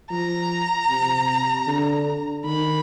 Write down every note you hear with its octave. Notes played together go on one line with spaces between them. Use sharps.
F3 A#5
C3
D3
D#3 B5